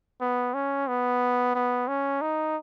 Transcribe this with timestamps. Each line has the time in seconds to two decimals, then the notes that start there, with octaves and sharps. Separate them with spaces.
0.21 B3
0.54 C#4
0.88 B3
1.55 B3
1.88 C#4
2.22 D#4